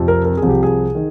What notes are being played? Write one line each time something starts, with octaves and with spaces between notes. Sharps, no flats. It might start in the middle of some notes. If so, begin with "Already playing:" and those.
Already playing: F2 C3 F3
A#4
A#4
G#4
C2 C3 F3
G4
G#4
D#3